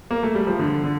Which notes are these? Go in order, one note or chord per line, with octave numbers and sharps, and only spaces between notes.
A#3
A3
G3
F3
D3
D3